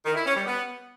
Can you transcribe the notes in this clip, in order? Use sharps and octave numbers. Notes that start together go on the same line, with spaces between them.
D#3
E4
C#4
G3
B3